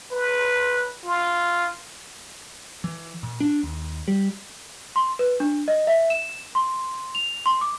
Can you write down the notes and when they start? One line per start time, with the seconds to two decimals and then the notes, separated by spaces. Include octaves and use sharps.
0.12 B4
1.05 F4
2.84 E3
3.23 A#2
3.40 D4
3.63 D#2
4.08 G3
4.96 C6
5.19 B4
5.40 D4
5.68 D#5
5.87 E5
6.10 E7
6.55 C6
7.15 F7
7.46 C6
7.61 D6